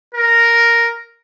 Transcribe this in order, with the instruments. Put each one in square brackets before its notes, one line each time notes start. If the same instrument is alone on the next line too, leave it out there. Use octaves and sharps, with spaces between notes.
[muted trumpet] A#4